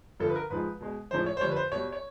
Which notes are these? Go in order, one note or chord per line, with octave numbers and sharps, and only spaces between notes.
G2 D3 F3 A4
B4
A#4
G#2 F3 G#3 B4
B2 G#3
A2 F3 G#3 C5
C#5
C5
F2 D3 G3 C#5
B4
C5
B2 G3 C#5
C#5